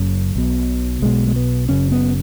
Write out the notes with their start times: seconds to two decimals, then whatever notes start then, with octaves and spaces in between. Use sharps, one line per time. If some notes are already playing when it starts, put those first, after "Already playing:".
Already playing: F#1 F#2 C#3
0.35 B1 B2
1.02 B1 B2 G#3
1.27 G#3
1.36 B3
1.69 F#1 F#2 C#3 C#4
1.91 B3